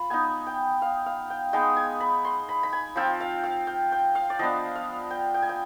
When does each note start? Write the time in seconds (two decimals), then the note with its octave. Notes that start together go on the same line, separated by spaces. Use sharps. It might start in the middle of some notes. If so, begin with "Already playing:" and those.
Already playing: F4 B5
0.10 B3 D#4 G#5
0.47 G5
0.82 F5
1.06 F5
1.30 G5
1.53 G#3 B3 D#4 G5
1.77 G#5
2.00 B5
2.25 C6
2.49 B5
2.63 B5
2.73 G#5
2.96 F3 C4 F4 G5
3.20 F5
3.44 F5
3.67 G5
3.92 G5
4.15 F5
4.30 D5
4.39 F3 B3 D4 D#5
4.75 F5
5.11 G5
5.34 G5
5.42 G#5
5.49 G5